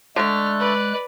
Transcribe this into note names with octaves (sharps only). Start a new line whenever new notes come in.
D3 G#3 A3 F6 F#6
B4 D5